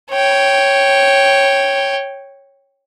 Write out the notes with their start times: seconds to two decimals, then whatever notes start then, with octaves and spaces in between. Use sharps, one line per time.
0.12 C#5 G5